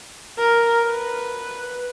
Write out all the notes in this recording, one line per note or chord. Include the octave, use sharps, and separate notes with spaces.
A#4
B4